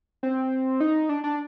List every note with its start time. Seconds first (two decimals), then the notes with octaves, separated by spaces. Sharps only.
0.23 C4
0.80 D#4
1.09 D4
1.24 D4